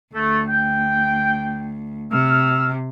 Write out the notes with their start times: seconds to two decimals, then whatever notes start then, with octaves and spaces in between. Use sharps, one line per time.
0.14 D2 A3
0.48 G5
2.12 C3 E6 F6